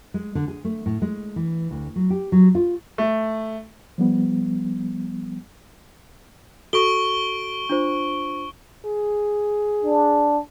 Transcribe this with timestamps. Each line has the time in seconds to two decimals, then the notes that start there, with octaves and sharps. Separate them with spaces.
0.14 G#3
0.35 D3
0.48 G#4
0.65 A3
0.86 A2
1.02 G#3
1.36 E3
1.71 D2
1.96 F#3
2.10 G4
2.32 F#3
2.55 F4
2.98 A3
3.98 F3 G3 B3
6.73 F#4 A4 C#6 D7 G7
7.69 D4 F4 C5
8.86 G#4
9.84 D4